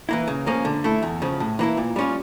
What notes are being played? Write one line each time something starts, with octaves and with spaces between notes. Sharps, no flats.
E3 A#3 E4
C#3
F3 A#3 C#4
D3
A3 E4
E2
C#3 F3
A2
E3 A#3 E4
A#2
G3 C#4 F4